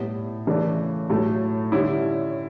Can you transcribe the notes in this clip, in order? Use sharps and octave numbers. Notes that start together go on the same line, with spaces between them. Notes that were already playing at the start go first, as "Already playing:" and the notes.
Already playing: A2 G3 B3
C#3 E3 A3 D4
A2 F#3 A3
D3 G3 C#4 E4